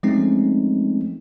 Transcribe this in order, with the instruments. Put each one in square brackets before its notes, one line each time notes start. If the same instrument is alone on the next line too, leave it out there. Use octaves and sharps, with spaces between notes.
[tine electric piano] F3 G#3 A3 C4 C#4 D#4